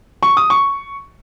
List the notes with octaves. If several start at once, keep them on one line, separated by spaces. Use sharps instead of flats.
C#6
D#6
C#6